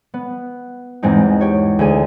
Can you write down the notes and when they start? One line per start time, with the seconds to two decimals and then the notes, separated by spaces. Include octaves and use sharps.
0.14 B3
1.03 E2 G#2 G#3 C4 D#4
1.41 G4 C#5
1.79 D2 G#4 D#7